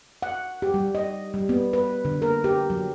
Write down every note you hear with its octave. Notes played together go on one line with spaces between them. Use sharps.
F#5
G4
G3
D#5
G3
B3
B4
D3
A#4
G4
F#3